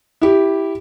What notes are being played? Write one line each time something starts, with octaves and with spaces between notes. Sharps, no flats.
E4 G4